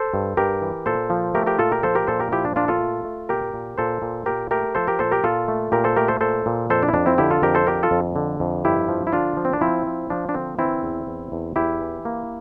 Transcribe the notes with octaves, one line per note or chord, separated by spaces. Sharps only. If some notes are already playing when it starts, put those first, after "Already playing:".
Already playing: A4 C5
G2
G2 G4 A#4
E3
A#2 A4 C5
F3
A3 G4 A#4
G4 A#4
A#2 F4 A4
G4 A#4
F3 A4 C5
G4 A#4
A#2 A4 C5
G4 A#4
F3 E4 G4
D4
A#2 D4 F4
F4 A4
A3
A3
A#2 G4 A#4
A#2
A#2 A4 C5
A#2
A#2 G4 A#4
A3 G4 A#4
F3 A4 C5
G4 A#4
A#2 A4 C5
G4 A#4
A#2 F4 A4
A3
A#2 G4 A#4
A4 C5
A3 G4 A#4
A4 C5
A#2 A4 C5
A#2
F2 A4 C5
D4
E4
F2 D4
C4 E4
D3 E4 G4
F4 A4
F2 G4 A#4
A4 C5
D3 G4 A#4
F4 A4
F2
D3
F2
G2 E4 G4
F3
E4
D3 D4 F4
F3
C4
D4
F3 C4 E4
F3
F3 D4
D4
D3 C4
E3 C4 E4
E2
E2
E2
E2 E4 G4
E3
A#3